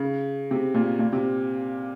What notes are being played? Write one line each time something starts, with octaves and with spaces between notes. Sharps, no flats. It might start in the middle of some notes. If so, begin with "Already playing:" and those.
Already playing: C#3
C3
A#2
A#2
C3